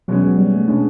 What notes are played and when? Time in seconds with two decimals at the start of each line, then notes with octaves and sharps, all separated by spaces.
0.08 B2 F#3 G#3 C#4
0.23 F#3
0.38 G3
0.53 A3
0.68 B2 G#3 C#4 D4